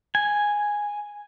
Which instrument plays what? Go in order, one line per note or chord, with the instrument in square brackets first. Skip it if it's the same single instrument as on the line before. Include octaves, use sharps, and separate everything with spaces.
[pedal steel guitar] G#5